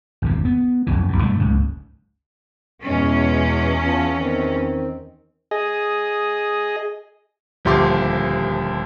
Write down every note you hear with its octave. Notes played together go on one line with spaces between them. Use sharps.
G#1 E2 C#3
B3
F1 A#1 F#2 E3
B1 G2
G2 F3 A3
F#1 C#2 G#2
E2 B2 E3 G#3 C#4
F4 A5
D#3 C4
G#4 D#5
D#1 D2 F3 G4 C6 D6